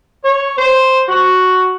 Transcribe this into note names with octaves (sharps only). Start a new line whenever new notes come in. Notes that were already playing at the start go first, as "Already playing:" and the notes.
C#5
C5
F#4